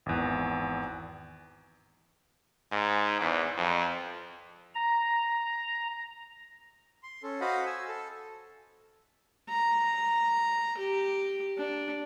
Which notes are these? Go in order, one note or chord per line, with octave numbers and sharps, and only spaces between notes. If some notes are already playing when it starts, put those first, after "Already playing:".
G#1 E2
G#2
E2
F2
A#5
C6
C#4 A4
F#4 C5 D#5 F5 F#5 B5
G#5 E6
A4
A#5
G4
D4